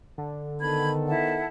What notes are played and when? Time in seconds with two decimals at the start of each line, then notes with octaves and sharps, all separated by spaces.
0.18 D3
0.60 D#3 B3 A4 B5 G#6
1.08 E4 F#5 A5